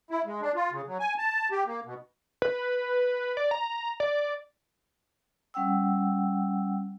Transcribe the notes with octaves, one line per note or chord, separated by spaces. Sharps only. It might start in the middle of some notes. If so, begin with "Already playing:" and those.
E4
G#3
D4
F4
C#3
F#3
G#5
A5
G4
A#3
B2
B4
D5
A#5
D5
G3 C#4 F#5 G5 E6